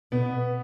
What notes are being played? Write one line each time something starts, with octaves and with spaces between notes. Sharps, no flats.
B2 B3